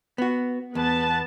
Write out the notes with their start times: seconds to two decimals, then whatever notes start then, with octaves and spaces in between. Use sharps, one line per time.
0.18 B3 F#4
0.75 E2 B3 B4 A5